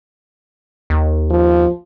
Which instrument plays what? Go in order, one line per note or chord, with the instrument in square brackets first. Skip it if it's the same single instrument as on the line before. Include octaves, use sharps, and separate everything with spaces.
[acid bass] D#2
[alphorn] F3